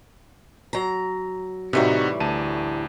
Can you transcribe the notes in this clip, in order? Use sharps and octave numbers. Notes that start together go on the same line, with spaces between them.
F#3 A#5
A2 C3 E3 G3 D#4 F#4
D2 A5 D#7